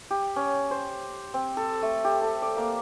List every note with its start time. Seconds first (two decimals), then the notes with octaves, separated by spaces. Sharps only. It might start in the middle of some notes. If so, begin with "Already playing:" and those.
0.11 G4
0.36 C#4
0.71 C5
1.34 C4
1.57 A4
1.82 A3
2.05 G4
2.22 A4
2.42 D5
2.57 A#3